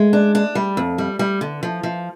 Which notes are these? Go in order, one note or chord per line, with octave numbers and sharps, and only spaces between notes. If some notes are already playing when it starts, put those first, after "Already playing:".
Already playing: G#3
D4
D4
G3
F2
G3
G3
D3
F3
F3